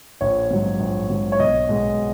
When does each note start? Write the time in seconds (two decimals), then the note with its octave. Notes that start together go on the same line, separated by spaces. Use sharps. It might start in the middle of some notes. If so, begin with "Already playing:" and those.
0.21 A#1 C#5
0.51 G#2 F#3
0.80 A#1
1.10 G#2 F#3
1.32 C#5
1.39 B1 D#5
1.69 B2 G#3 B3